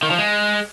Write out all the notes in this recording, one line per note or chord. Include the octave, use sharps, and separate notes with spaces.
D#3
F3
G#3